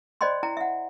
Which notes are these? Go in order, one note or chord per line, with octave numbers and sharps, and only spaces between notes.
C5 D5 D#5 G5 B5 C6
E4 G5 A#5
E5 F#5